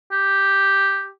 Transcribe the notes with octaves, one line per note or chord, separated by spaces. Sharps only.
G4